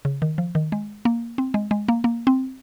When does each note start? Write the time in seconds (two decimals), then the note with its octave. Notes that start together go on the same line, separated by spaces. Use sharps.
0.05 C#3
0.22 D#3
0.38 F3
0.55 D#3
0.72 G#3
1.05 A#3
1.38 C4
1.54 G#3
1.71 G#3
1.88 A#3
2.04 A#3
2.27 C4